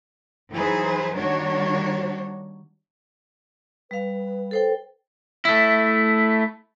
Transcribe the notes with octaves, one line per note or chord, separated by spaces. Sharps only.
E3 F#3 D#4 G#4 B4 C5
D#3 G3 A#3 D4 F#4 C#5
G3 B4 F5
A4 C5 G5
A3 E4